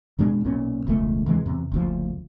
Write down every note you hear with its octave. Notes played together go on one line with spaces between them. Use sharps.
F#2 B2 G#3 D4
B1 A#2 C#4
E1 C#2 F#2 A3
D2 C3 E3 G#3
E2 C3
F#1 D2 F3